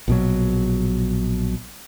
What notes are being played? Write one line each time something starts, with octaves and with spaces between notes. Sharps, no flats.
A#1 B2 F#3